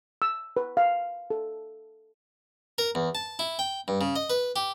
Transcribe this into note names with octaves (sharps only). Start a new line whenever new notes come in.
E6
B4
F5
A4
A#4
E2
A5
E4
G5
G2
C#3
D#5
B4
G4